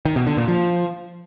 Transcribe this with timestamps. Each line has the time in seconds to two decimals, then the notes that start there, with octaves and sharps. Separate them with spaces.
0.05 D#3
0.16 B2
0.27 D3
0.37 A#2
0.48 F3